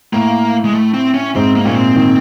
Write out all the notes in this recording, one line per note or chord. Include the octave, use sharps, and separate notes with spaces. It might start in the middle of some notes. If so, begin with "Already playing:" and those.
A2 A#3
G#3
A3
C4
C#4
G#2 C4
A#3
A#2 C#4
C4
D#3